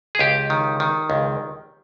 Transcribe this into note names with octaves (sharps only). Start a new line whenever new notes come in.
G#4
C#2 G4
D#3
D#3
C#2